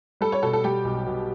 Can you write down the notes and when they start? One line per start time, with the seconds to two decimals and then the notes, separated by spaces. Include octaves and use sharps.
0.21 G3 A4
0.32 C#5
0.42 B2 A4
0.53 A4
0.64 G3 G4
0.85 B1
1.06 B2